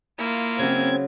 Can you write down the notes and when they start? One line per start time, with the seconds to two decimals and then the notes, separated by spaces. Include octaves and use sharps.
0.18 A#3 E4 F4
0.59 C#3 F#3 C4 G#6